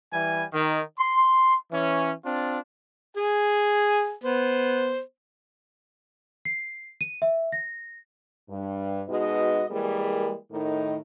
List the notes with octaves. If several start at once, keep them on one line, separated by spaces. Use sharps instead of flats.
E3 G3 G#5
D#3
C6
E3 C#4
C4 D4 F4
G#4 G#5
B3 C5
C7
D#7
E5
A#6
G2
B2 G#3 D#4 F#4 B4 D#5
E3 G3 G#3 A#3 G#4 A#4
A2 D#3 D#4